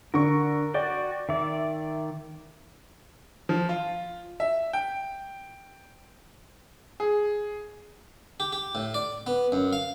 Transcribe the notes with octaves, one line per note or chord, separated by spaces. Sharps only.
D3 A#4 C#6
F#4 D5 G5
D#3 D5 E5
F3
F4
E5
G5
G#4
G4
G4
A2
D5
B3
F#2
F5